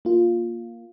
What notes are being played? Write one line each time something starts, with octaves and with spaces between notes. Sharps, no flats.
A#3 F4